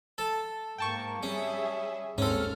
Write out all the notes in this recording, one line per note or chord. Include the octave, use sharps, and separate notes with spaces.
A4 A5
G#2 A#3 G5 A5 C#6
G3 C#4 G#4 E5
G#1 D#2 G#2 C4 C#4 A4 F6